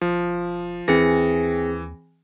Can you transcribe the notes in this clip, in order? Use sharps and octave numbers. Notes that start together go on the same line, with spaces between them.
E1 F3
D#2 E3 C4 G#4 A#6